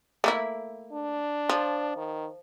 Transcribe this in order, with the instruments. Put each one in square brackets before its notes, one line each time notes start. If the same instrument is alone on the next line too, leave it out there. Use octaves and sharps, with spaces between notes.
[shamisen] A3 A#3 E4
[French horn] D4
[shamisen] F3
[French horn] D#3